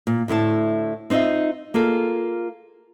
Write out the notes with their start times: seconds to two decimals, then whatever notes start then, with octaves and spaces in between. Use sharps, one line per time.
0.07 A#2
0.28 D2 A2 E4 A5
1.10 C4 D#4 F4 D#5 E5
1.74 A#3 F4 G#4 A4